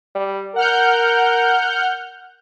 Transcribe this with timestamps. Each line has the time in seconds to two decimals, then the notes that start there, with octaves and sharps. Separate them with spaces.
0.15 G3
0.56 A#4 F#5 F6 G6